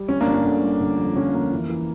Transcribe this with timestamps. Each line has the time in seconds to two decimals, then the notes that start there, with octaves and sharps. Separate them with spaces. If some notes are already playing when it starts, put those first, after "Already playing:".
Already playing: G3
0.09 G1 C#4
0.21 A#3 D4
0.27 G1
0.33 C#4
0.45 D3
0.62 G1
0.80 D3
0.98 F2
1.16 D3 C#4
1.34 F2 A#3
1.52 E3
1.69 E3